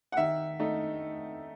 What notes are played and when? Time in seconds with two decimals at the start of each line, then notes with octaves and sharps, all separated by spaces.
0.12 F#5
0.17 D#3 E5
0.60 A3 D#4